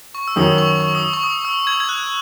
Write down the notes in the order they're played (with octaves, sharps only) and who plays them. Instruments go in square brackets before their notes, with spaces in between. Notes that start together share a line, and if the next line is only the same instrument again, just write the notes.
[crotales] C#6
E6
[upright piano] F#2 D#3 F#3 [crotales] D#6
[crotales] C#6
C#6
D#6
C#6
D#6
E6
G#6
G#6
F#6